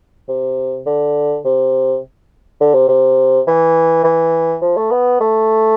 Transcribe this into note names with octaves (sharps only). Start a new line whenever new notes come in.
C3
D3
C3
D3
C3
C3
E3
E3
F3
A3
B3
A3